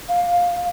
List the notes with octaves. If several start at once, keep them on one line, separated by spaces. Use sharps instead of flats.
F5